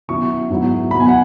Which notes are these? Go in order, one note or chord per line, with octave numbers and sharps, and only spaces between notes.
B2 F#3 C#4 E4 C#6
G#2 F#3 B3 E4
B2 F#3 B3 B5
G#5
F#5